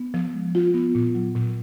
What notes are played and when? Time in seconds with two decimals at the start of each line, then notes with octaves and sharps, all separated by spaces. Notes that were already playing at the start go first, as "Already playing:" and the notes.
Already playing: B3
0.14 F3
0.34 G#3
0.55 F4
0.74 B3
0.95 A#2
1.15 F#3
1.35 A#2